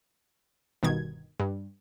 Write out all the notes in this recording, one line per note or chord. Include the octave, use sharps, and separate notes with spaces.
G1 B2 D#3 G#6
G2